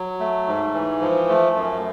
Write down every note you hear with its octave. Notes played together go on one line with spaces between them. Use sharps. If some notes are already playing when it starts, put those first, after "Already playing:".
Already playing: F#3
A3
G#2
E3
F3
A3
F#2